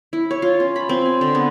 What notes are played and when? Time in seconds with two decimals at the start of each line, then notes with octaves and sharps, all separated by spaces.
0.13 E4
0.31 C#5
0.42 F4
0.60 C#4
0.76 B5
0.89 C4
1.06 G#5
1.21 D3
1.35 B3